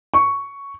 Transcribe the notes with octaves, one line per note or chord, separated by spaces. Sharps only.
C#6